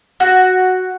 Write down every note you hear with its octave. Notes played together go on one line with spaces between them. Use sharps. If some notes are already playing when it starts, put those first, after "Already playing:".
F#4